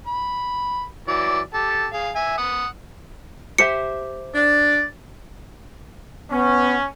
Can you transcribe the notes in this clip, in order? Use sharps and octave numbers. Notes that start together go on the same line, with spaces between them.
B5
E3 F#3 D5
G4 A4
G#4 F5
E5 G#5
F#5 D#6
G4 C5 E5 C#7
D4 D5
B3 C#4